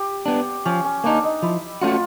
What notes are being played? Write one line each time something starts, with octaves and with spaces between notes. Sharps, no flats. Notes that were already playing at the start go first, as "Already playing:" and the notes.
Already playing: G4
B3 D4
F3 C#4
C#4
A#3 D4 D#4
D#4
F3 E4
A3 C#4 F4 F#4